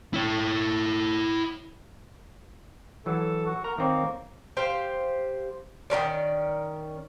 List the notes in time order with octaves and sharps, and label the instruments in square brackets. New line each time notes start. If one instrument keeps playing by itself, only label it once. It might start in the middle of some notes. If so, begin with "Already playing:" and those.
[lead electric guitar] E4 C#5
[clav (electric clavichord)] E3 F#3 [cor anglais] A4
[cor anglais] F#4
[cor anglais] A#4 [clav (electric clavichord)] A#5
[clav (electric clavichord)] D#3 C4 C#5 [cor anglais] A#3
[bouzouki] G4 C5 F5
D#3 A#3 C#4 D5